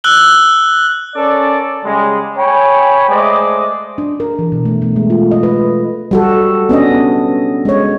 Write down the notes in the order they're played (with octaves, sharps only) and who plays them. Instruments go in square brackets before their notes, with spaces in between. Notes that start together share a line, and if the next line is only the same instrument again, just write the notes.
[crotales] E6 F#6 F#7 G7
[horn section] C#4 A4 A#4 D5
C#3 G3 G#3
C#5 G5 G#5 B5
G#3 A3 C5 D5 D#5
[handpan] D4
A#4
E3
B2
A3
A3
G#3
F4
D#5
B4
G3 F#4 A4
B3 C#4 D4 D#5
G#3 C#5